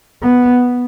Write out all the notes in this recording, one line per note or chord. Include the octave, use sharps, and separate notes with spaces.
B3